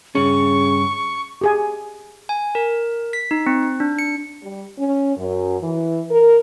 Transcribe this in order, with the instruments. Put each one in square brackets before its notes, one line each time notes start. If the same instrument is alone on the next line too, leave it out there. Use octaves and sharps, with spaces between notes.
[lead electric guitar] G2 C#4 [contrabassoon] C#3 [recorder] C#6
[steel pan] G4 G#4 G#5
[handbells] G#5
A#4
B6
D#4
C4
D4
C#7
[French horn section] G3
C#4
F#2
E3
A#4